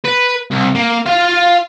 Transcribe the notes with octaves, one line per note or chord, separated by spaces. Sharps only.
B4
C2
A#3
F4 F5